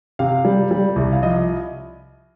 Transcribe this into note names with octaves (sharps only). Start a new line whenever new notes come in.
C3 F5
G3
G3
C2
F5
F3 D#5